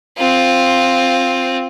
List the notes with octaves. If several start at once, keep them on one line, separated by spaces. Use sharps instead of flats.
C4 F4